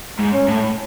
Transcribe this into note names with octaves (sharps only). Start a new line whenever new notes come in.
G#2
C#4
A2